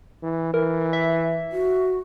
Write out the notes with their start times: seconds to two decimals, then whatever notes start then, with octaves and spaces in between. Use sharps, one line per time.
0.23 E3
0.54 E3 A#4
0.93 E5
1.52 F#4